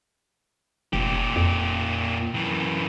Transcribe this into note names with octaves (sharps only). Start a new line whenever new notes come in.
F1 A#2 G4
F2
F#2 E3